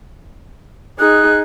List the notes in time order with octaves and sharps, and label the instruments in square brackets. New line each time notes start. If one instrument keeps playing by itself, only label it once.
[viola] D#4 G#4 [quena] F#6